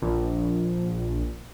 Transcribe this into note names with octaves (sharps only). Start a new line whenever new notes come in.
A#1